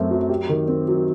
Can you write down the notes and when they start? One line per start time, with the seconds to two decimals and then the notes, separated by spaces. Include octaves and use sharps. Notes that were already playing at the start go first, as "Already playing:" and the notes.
Already playing: F#2 A3 C4
0.11 F#3
0.29 G4
0.49 D#3
0.68 C4
0.88 F#3